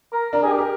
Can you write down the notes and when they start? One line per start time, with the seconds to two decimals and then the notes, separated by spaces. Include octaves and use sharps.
0.13 A#4
0.32 D4 A#4
0.43 G4 G#4 A#4
0.53 D4
0.58 G4 A#4